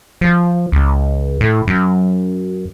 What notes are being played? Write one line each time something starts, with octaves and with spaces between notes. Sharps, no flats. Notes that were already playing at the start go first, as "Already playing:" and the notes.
F3
C#2
A2
F#2